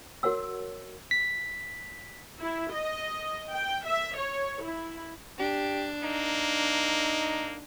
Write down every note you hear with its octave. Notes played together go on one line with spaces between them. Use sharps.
F#4 A#4 C#5 F#5 E6
B6
E4
D#5
G5
E5
C#5
E4
D4 G4
A#3 D#4